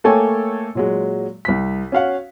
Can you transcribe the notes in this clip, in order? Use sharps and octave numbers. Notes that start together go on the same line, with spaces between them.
A3 A#3 A4 C#5 G5 G#5
A#2 F#3 G#3
C2 B6
C#4 F#4 F5 F#5